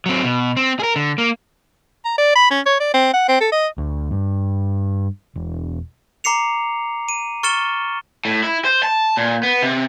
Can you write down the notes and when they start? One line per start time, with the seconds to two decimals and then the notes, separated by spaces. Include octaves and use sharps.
0.06 F#3 C4
0.23 B2
0.57 C4
0.80 G#4 A#4
0.96 D3
1.18 A#3
2.05 A#5
2.18 D5
2.35 B5
2.51 C#4
2.66 C#5
2.80 D5
2.94 C4
3.13 F#5
3.29 C4
3.41 A4
3.52 D#5
3.78 D2
4.11 G2
5.36 E1
6.24 A#5 D6 C7 C#7 F7
7.09 D#7
7.43 C#6 F6 A6 C#7 E7 G7
8.25 A2
8.43 E4
8.65 C5
8.83 A5
9.17 A#2
9.43 B3
9.62 C3